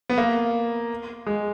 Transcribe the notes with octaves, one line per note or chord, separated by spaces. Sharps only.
B3
A#3
G#3